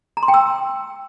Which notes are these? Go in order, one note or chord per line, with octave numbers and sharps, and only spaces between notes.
A#5
C6
G5
E6